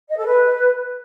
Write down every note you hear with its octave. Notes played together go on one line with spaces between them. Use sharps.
D#5
A4
B4